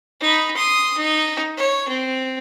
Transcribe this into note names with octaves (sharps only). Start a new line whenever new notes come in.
D#4 B5
C6 D#6
D#4
C#5
C4